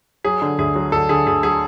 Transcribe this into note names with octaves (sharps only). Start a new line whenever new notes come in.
F#3 G#4
D3
D2 G#4
F#3
D2 A4
D3 G#4
D2 G#4
F#3 G#4